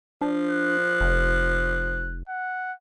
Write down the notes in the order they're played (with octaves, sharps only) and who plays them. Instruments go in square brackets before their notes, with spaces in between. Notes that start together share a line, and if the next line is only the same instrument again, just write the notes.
[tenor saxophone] F3 [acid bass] D4
[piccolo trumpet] F#6
[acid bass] F1
[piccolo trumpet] F#5